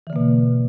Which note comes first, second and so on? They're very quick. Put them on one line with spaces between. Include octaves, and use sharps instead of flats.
E3 D3 A#3 B2